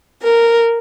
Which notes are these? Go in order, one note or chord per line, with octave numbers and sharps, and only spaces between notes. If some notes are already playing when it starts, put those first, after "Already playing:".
A#4